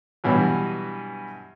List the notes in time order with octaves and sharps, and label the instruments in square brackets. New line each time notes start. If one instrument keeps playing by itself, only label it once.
[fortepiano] G2 B2 E3 F#3